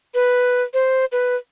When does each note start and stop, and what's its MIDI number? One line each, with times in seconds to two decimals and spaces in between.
0.14 0.62 71
0.74 1.05 72
1.12 1.36 71